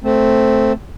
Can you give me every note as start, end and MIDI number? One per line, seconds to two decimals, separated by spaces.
0.03 0.72 57
0.03 0.72 60